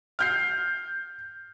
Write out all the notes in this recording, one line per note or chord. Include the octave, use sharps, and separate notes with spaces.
F6 G6 C7